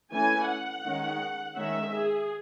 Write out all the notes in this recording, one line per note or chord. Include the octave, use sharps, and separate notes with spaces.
E3 A3 C#4 G#5
F#5
D#3 G#3 C#4
D#3 G#3 C#4 E5
G#4